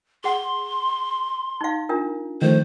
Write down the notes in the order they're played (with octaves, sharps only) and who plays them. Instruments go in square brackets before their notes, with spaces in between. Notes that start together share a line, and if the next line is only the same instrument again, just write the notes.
[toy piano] G#4 F#5 [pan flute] C6
[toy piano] D#4 F5
D4 F4 A#4
[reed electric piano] D#3 F3 A3 [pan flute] C5